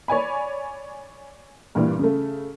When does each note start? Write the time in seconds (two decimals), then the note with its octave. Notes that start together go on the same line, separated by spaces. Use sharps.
0.08 C#5 D5 G#5 B5
1.75 G2 A#2 E3 G3
1.99 C#3 A3